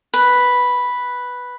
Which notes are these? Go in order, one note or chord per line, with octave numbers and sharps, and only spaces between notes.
B4